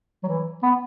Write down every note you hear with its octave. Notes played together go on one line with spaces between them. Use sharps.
F#3
E3
B3